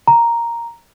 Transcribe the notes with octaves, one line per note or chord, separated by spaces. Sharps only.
A#5